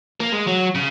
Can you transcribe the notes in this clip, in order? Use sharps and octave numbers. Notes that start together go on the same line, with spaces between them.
A#3
G#3
F#3
C#3